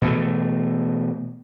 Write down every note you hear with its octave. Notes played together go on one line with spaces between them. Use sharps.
B2 E3 A3